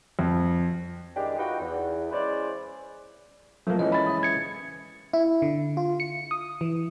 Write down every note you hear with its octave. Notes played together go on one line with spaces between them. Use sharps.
F2
D#3 E3 G#3 D4 G4
D#4 F4 F#4 B4 G5
E2
E3 G#3 C#4 B4 C5 D5
F3 F#3 A3 A#3
E3 G#3 C#4 D#5
B5 A6
E5 D#6
G#6 C#7
E4
D3
F4
C#7
D#6
E3